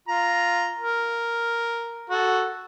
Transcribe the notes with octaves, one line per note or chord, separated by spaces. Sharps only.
F4 A#5
A#4
F#4 A4